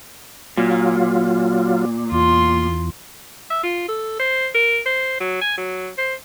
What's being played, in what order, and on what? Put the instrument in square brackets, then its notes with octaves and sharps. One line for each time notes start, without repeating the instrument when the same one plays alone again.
[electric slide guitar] A#2 [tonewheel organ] F#3 F4
[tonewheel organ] E2 [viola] F4 C6
[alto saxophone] E5
F4
A4
C5
A#4
C5
F#3
G#5
F#3
C5